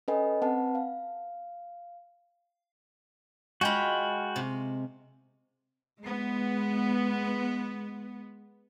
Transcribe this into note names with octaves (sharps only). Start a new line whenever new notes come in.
C#4 A4 B4 D#5 G#5
C4 B4 F#5 A5
F5
G#3 F4 F#4 G5 B5
C3
G#3 B3